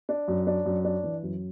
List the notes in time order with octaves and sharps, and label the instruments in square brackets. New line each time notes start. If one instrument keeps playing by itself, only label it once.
[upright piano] D4
F#2
D4
F#2
D4
E3
F#2